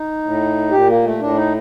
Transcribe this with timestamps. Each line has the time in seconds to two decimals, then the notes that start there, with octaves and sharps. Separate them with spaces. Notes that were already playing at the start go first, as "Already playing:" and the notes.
Already playing: D#4
0.23 A2
0.71 A#2 G4
0.88 A#3
1.04 A3
1.19 A2 D4
1.36 D#4